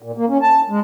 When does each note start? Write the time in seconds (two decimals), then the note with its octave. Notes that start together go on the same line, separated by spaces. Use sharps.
0.02 A#2
0.17 A#3
0.29 C#4
0.42 A5
0.70 G#3